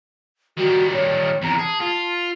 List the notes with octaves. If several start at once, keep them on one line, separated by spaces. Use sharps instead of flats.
D#3 G3 F#4
C#5
E2 C3 A#5
G#4 A5
F4